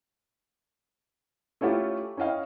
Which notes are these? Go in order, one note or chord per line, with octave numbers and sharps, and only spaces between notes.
A3 C#4 E4 F4 G4 A4
C#4 E4 D#5 F5 G5